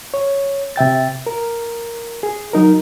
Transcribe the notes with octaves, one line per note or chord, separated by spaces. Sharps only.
C#5
C3 E5 G5 A6
A#4
G#4
F#3 D#4 A#4